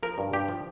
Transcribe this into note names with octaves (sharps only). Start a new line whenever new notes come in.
F3 A#4
G2
G2 G4
F3